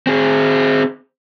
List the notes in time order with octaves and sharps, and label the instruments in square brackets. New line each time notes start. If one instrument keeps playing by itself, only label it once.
[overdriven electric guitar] C4 G#4